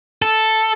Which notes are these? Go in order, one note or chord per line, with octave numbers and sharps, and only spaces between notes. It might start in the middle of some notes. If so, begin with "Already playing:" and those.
A4